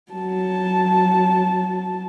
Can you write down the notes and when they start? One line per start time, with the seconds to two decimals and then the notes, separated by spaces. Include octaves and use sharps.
0.12 F#3 A5